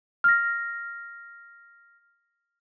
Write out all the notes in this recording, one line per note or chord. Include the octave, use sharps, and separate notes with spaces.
F6 A#6